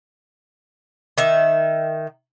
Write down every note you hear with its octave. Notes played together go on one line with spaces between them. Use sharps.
D#3 E5